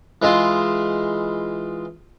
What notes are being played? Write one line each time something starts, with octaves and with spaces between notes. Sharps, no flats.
E3 G#3 E4 F4